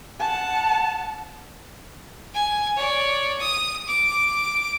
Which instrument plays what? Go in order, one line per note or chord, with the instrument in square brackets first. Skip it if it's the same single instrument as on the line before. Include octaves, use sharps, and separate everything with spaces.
[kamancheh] F#5 A5
[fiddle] G#5
C#5 D5
D#6
D6